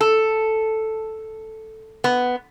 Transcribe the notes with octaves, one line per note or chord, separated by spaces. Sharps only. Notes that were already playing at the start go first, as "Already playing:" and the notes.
A4
B3